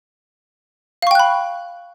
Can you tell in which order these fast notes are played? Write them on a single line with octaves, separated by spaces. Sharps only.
F5 C#6 G5 F#6 B5